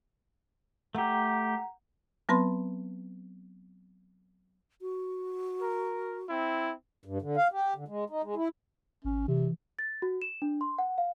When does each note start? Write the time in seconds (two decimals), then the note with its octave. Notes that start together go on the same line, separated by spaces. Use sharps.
0.95 A3 G4 F#5 A#5
2.29 F#3 B3 C4 B4 B5 C6
4.82 F#4
5.61 A#4
6.29 C4 E4
7.05 G2
7.22 D3
7.37 F5
7.52 G4
7.76 D3
7.88 G#3
8.10 D#4
8.23 G#3
8.36 E4
9.05 G#1 C#4
9.28 C3 E3
9.79 A6
10.02 F#4
10.22 E7
10.42 D4
10.61 C6
10.78 F#5
10.98 F5